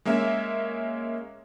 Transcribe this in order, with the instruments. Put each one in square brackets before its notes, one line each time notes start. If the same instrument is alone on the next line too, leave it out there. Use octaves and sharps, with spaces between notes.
[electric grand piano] G#3 A#3 C#4 E5